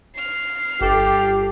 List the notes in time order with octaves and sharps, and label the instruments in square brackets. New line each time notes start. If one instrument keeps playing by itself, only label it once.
[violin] F6 C7
[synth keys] G1 A4 D6 [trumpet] G4